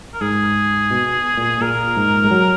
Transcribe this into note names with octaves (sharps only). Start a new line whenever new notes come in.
A#4
G#2 G#4
B2
A#2
A#2 A#4
G#2
G#3
F#3